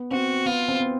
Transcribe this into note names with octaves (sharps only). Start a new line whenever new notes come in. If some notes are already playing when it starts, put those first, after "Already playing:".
Already playing: B3
C4 F#4
B3 F4
C4
B3